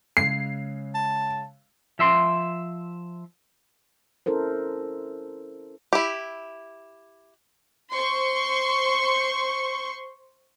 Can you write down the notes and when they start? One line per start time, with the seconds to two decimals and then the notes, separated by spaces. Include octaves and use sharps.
0.17 C#3 G#3 C7
0.94 A5
1.99 F3 E5 C6
4.26 C#4 E4 A4 A#4 C5
5.93 E4 G4
7.93 C5 C6 C#6